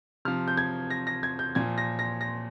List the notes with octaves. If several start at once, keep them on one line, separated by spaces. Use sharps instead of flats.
C3 F3 F6
G6
G#6
A#6
A#6
G#6
G6
A#2 F3 G#6
A#6
A#6
A#6